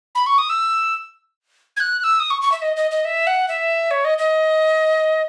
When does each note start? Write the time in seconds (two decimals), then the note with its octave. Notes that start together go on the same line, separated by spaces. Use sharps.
0.15 B5
0.26 C#6
0.38 D#6
0.49 E6
1.77 G#6
1.80 F#6
1.99 F#6
2.04 E6
2.20 D#6
2.30 C#6
2.42 C#6
2.52 E5
2.62 D#5
2.76 D#5
2.91 D#5
3.05 E5
3.27 F#5
3.48 E5
3.91 C#5
4.05 D#5
4.18 D#5